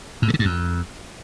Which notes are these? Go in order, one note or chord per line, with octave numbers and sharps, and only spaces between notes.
A2
G2
D3
G2
F2